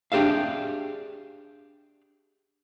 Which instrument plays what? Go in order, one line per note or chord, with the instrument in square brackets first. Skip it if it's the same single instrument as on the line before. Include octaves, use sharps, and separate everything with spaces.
[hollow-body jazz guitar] D4 G4 G#4 E5 F5